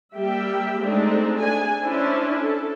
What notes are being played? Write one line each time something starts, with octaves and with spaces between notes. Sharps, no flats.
G3 A#3 G4 E5 G5
G#3 A3 C4 D4 D#4
D4 G#4 G#5
C#4 D4 E4 C5
A4